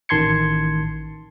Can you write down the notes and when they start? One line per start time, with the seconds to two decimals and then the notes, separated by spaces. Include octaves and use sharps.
0.09 A1 D#3 A5 C6 G#6 C#7